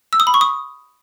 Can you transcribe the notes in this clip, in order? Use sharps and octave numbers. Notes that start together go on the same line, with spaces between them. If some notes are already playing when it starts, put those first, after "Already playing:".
E6
D#6
B5
C#6
D#6